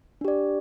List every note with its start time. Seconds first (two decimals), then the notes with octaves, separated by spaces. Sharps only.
0.21 D4
0.25 G4
0.28 D5